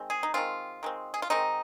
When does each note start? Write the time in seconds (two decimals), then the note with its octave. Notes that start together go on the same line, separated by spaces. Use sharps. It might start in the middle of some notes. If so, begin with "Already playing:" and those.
Already playing: D#3 G#3 C4
0.10 G#4
0.23 D#4
0.34 D#3 G#3 C4 F4
0.83 D#3 G#3 C4
1.14 G#4
1.22 F4
1.30 D#3 G#3 C4 D#4